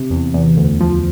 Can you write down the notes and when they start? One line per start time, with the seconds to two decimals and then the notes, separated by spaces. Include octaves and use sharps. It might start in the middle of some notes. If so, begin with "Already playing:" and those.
Already playing: C3
0.10 E2
0.34 E2
0.57 D2
0.81 F3